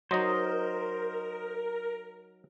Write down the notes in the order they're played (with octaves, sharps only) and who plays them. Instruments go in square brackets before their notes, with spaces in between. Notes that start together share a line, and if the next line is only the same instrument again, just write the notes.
[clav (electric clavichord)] F#3 D#4 [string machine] A#4 [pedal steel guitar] C5 D#5